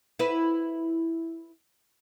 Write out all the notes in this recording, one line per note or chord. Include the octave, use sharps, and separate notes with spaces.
E4 B4